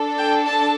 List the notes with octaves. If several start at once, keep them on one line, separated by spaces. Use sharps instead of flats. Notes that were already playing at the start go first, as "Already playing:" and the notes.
Already playing: D4 A4
G5
A5